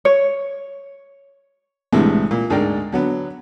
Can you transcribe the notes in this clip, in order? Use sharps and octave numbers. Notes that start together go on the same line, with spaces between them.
C#5
C2 A2 D3 E3 G3 G#3
A#2
D2 G#2 G#4 A#4 D5 G5
D3 F#3 B3